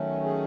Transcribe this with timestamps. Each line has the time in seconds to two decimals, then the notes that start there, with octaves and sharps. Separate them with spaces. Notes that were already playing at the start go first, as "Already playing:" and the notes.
Already playing: D#3 F#3 A3 C#4
0.24 G#4